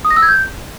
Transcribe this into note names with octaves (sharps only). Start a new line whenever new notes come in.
D#6
A#6
E6
G#6
G6